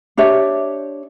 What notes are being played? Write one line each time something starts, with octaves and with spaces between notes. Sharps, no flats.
D4 G4 C#5 E5